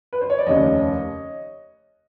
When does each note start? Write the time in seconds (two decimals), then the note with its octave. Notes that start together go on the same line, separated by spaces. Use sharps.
0.13 B4
0.21 C5
0.30 C#5
0.38 D5
0.46 F1 D#2 C#3 C#5 D#5